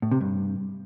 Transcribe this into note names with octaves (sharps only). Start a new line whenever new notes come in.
A2
C3
G2